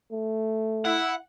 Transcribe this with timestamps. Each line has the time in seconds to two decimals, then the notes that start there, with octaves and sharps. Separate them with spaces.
0.12 A3
0.85 E4 F#5